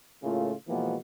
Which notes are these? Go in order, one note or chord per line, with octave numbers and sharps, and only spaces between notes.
A2 C#3 A3 A#3 F4
B2 E3 F3 G#3 A#3 B3